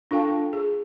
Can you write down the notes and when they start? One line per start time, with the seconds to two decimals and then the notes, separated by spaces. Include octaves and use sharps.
0.11 D4 F4 A4 F5 G5 A5
0.53 G#4